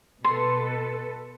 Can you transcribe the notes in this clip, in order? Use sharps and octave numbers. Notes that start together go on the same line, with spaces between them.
B2 A4 B4 C6